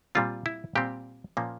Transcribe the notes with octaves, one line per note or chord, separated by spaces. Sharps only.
A#2 G3 C4 F4
E4
A#2 G3 C4 G4
A#2 F3 A#3 C#4